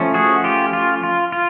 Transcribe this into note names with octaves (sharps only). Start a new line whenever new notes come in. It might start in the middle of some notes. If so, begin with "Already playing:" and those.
Already playing: F3 A3 C#4
F#4 G#4
F4 G4
F4
F4
F4